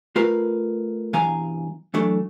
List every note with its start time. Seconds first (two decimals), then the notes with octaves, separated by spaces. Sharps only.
0.16 A3 F4 A#4 B4
1.13 G2 B2 E3 F5 G#5 A#5
1.94 E3 F#3 A3 D4